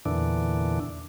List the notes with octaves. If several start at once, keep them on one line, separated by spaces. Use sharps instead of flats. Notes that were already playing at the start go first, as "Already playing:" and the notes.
E2 A#2 D3 E3 D4